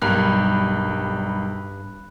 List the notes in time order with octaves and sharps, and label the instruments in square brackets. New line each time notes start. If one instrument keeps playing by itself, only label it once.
[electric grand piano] B1 G3 A#4 [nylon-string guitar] G2 [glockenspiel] B5 F#6